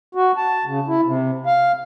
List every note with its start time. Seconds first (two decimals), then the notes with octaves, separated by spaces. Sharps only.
0.15 F#4
0.37 A5
0.65 C#3
0.88 E4
1.04 C3
1.46 F5